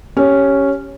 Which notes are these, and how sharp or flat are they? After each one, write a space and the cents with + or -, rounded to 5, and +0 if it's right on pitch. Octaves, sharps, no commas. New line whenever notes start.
C#4 +0 G4 +0